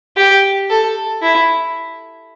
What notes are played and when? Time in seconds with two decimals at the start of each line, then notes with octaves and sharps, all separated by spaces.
0.17 G4
0.70 A4
1.22 E4